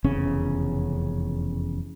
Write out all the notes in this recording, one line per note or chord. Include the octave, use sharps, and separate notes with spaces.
F1 E2 C#3 C#4